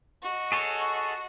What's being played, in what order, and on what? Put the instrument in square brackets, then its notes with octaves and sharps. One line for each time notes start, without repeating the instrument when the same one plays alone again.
[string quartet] F#4 D#5
[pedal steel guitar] G#4 A4 C#5